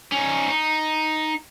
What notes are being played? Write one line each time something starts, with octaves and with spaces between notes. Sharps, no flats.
C#4 D#4
D#4